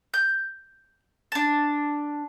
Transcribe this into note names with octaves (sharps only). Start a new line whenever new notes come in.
G6
D4 A5